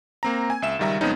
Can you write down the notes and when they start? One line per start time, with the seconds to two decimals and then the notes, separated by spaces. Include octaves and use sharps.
0.23 A#3 C4 A#5
0.50 G#5
0.62 C#2 E5 E7
0.79 C#2 D#3 G3 E5 A#5
1.01 F2 C#3 G#3 B3 C#4 D#4